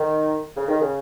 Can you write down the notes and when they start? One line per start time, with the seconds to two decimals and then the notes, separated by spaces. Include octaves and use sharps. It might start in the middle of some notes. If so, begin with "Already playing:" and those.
Already playing: D#3
0.56 C#3
0.68 D#3
0.80 C#3